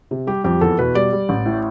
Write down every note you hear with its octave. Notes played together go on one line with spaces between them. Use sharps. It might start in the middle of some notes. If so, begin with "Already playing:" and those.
C3
G3 G4
F2 G4
E2 A4
B2 B4
G3 D5
G3
A1
A2